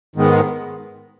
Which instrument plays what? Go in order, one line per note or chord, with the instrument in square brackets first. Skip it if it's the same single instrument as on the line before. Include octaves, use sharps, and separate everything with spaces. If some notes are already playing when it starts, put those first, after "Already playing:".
[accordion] G#2 D#3 G#3 B3